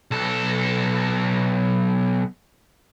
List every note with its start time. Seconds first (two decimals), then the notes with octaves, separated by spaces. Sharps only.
0.11 B1 A4